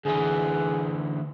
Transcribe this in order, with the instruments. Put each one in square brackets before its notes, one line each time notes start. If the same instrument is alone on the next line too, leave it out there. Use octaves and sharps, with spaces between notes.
[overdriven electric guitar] D2 E3 [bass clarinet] G#4